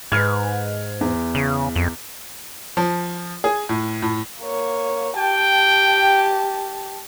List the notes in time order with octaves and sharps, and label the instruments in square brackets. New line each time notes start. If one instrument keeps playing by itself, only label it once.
[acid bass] G#2 [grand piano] B4 F6 G#6
[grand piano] E2
[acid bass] C#3
F2
[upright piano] F3
G#4
A2
A2
[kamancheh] A#3 C#5
[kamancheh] G4 A5 [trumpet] G5